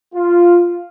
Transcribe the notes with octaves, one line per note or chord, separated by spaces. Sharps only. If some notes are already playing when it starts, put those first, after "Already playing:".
F4